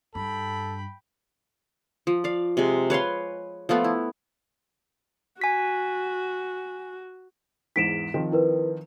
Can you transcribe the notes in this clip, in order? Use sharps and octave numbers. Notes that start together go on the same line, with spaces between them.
G2 A4 G5 B5
F3
D5 F5
C3 G#3
B4 C#5 F5 C6
F3 A3 B3 F4
E4
F#4 G#5 B6
E2 G#2 B6 D7 E7
D#3 F3 C4
E4 A#4 B4